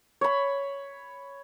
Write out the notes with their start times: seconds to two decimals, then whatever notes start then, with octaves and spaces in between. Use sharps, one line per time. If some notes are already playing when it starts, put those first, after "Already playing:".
0.21 C#5 B5